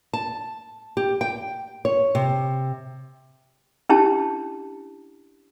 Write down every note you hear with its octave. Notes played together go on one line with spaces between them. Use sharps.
A5
G4
G5
C#5
C3
C#4 D4 E4 G4 A5